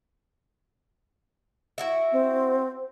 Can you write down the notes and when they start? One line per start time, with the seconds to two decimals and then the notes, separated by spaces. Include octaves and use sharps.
1.78 E4 F#4 E5
2.12 C4